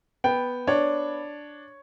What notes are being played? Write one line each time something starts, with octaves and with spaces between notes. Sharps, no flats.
B3 G5
D4 C#5